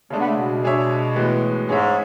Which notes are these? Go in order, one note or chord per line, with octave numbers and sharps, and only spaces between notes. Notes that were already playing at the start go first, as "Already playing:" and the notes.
C#3 G#3 A3 D4
B3
A3
B2
G#3 D4 G#4 C#5 E5
A2 E3 G#3 B3 F#4
G#2 G#3 C#4 G#4 C#5 E5